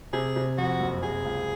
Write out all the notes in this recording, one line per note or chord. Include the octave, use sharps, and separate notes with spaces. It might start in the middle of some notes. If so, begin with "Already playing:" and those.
C3 G#4
C3
F2 F#4
F#1
C3 G#4
C#2